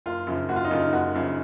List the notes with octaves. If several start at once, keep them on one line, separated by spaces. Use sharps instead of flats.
F#1 F4
F#2 C#3 F3
F#1 F#4
F4
D#4
F#2 C#3 F3 F4
F#1 F#4
F#2 C#3 F3